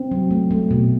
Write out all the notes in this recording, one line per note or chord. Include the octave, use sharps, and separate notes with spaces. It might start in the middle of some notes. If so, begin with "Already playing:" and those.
Already playing: C4
F#3
A3
A3
B2